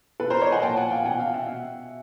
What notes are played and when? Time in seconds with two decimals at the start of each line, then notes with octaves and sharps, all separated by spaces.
0.20 B2 A4 B4
0.30 A#4 C5
0.41 C#5 D#5
0.52 F#5 G#5
0.63 A#2 F3 G5 A5
0.77 F#5 G#5
0.91 F5 G5
1.05 B2 F#5 G#5
1.19 F5 G5
1.34 E5 F#5
1.48 B2